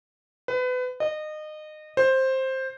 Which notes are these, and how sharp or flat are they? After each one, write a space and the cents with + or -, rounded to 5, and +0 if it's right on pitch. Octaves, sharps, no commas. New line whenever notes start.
B4 +30
D#5 -25
C5 +10